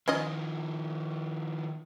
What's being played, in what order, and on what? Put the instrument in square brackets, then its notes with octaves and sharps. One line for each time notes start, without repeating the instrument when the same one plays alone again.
[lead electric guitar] D#3 F3 [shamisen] C#4 F4 D#5